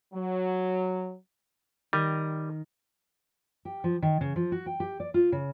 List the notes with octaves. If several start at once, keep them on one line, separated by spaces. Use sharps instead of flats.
F#3
D#3 G3 A#4 D#5
G4
F3
D#3
C#3
F3
F#4
G5
G4
D5
F4
C#3